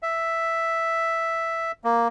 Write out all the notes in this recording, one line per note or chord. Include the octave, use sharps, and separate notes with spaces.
E5
A#3